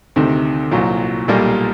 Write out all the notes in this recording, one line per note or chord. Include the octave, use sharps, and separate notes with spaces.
D2 C3 D#3
C2 A#2 F#3
B1 A#2 G3 A#3